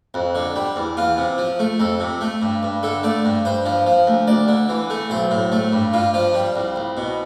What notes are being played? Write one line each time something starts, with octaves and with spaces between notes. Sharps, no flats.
F2
D3
G3
E2
E2 F4
C3
F3
A3
F2 A4
C3
A3
G2
G2
D3 A4
A3 D5
G2
G2 C5
F3
F3
D2
D2 D5
D3
E3
A3
B1 C5
A2
A3
G2
G2 F4
F3 F4
G3
C2
C2
B2